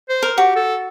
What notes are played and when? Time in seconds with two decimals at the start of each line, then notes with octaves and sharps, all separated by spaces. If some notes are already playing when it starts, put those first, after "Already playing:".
0.09 C5
0.23 A#4
0.38 F#4 G4
0.56 A4